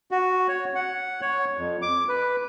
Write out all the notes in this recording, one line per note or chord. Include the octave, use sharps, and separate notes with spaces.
F#4
C#5
F#5
C#5
F2
D6
B4